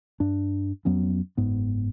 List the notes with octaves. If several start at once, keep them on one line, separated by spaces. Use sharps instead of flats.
G2 D4
F2 F#3 B3 C#4
F#1 G#2 B3